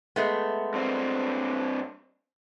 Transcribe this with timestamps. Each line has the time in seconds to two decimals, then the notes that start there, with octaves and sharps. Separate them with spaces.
0.16 G#3 A3 B3
0.74 G2 C4